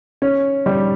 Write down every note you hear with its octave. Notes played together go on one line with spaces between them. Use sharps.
C#4
G3